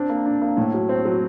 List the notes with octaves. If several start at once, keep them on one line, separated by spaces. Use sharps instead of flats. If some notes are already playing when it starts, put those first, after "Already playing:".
Already playing: C4 D4
A#3
D4
A#3
A2
F#3
C4
F#3